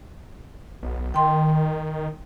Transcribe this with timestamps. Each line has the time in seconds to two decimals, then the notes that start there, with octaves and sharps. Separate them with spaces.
0.83 B1
1.14 D#3 G5 C6